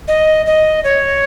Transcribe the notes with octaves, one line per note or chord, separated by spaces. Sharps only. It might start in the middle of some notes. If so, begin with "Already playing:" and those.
D#5
D#5
C#5